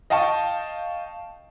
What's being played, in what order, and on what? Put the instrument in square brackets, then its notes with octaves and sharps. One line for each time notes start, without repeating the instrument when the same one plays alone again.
[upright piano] D#5 F5 G5 A5 C#6